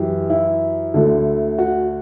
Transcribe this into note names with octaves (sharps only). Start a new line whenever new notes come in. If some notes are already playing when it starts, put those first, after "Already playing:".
Already playing: F#2 E3 G4
E4
D2 D3
F#4